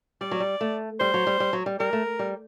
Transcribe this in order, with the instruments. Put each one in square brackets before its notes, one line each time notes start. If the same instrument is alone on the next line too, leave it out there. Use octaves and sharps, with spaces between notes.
[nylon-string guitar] G3 [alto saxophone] D5
[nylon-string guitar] F#3
G3
A3
[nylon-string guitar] G3 [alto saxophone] C5
[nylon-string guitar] F#3
G3
G3
F#3
G3
[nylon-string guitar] G3 [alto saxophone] A#4
[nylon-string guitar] A3
G3